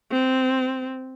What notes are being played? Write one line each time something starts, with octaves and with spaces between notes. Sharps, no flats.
C4